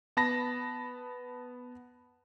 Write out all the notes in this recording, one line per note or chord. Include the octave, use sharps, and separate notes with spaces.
B3 A5 B5 A#6